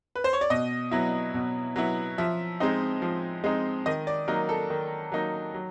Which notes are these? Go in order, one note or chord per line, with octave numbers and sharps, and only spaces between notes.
B4
C5
C#5
D5
B2 D#5
F#3 B3 E4
B2
F#3 B3 E4
F3 E5
G#3 C4 D#4
F3
G#3 C4 D#4
D#3 D#5
D5
F#3 A#3 D#4 A#4
A4
D#3
F#3 A#3 D#4
F#3